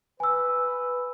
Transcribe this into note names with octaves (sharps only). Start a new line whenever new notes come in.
B4 G#5 E6